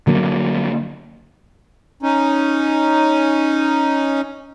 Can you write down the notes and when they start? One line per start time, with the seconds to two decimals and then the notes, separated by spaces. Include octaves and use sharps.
0.07 D3 F#3 A#3
2.03 C#4 D#4